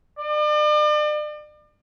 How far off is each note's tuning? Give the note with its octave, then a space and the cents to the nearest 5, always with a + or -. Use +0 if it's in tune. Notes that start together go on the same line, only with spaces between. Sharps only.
D5 +40